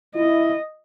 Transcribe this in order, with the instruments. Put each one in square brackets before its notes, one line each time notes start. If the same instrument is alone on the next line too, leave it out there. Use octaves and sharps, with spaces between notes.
[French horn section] E4 [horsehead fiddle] D#5